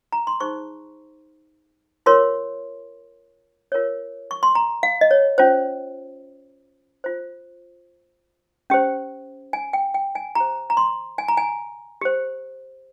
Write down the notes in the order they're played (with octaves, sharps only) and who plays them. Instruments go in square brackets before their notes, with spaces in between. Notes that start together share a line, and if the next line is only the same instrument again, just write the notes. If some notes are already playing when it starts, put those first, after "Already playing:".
[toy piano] A#5
C6
D#4 G#4 C5 C#6
F4 A#4 C#5 C6
F4 A#4 C#5
C#6
C6
A#5
F5
D#5
C#5
C#4 F4 C5
F4 C5
C#4 G4 C5
G#5
G5
G5
G#5
G4 C5 A#5
A#5
C6
G#5
A#5
G#5
G4 C5